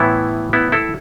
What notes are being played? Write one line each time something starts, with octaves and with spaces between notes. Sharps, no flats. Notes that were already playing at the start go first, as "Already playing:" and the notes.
Already playing: A2 E3 B3 E4
B3 E4
E4 A4